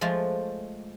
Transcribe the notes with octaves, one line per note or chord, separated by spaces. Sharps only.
F3 G#3 A3 F4